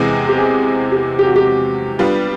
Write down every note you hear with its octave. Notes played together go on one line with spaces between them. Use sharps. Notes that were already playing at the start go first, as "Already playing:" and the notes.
Already playing: E2 C3 E3 G#3 C4 G#4
G4
G#4
G4
G4
F#4
G4
G3 B3 D4 F4